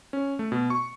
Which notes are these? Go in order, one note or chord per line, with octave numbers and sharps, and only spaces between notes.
C#4
A3
B2
C#6